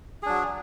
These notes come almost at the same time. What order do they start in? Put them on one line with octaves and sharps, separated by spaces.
G#4 D4 F#3